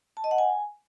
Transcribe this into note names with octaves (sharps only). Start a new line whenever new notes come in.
A5
D#5
F#5
G#5